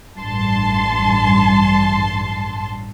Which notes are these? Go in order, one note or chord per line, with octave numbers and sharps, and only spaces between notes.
A1 G2 A5 C6